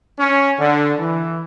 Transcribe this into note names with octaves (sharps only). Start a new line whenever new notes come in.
C#4
D3
E3